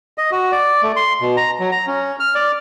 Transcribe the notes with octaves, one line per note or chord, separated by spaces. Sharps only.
D#5
F#4
D5
A3
C6
B2
A#5
F#3
A#5
C#4
F6
D5